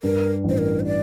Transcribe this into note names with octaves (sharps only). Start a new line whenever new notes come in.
G2 A#4
A1
C5
A#4
C5
D5